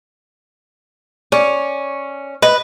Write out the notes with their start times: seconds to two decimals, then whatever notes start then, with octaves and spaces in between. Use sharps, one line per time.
1.32 C#4 D5
2.42 B4 D#5